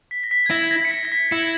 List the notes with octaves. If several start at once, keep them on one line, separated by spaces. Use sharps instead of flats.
B6
A#6
B6
G#6
E4 A#6
A#6
C#7
B6
A#6
B6
E4 C#7